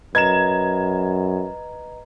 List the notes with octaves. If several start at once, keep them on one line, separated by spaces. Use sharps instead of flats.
F#2 B4 D#5 A#5 G#6 E7